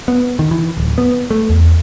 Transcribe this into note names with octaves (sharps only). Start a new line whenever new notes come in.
B3
D#3
E3
D1
B3
A3
E2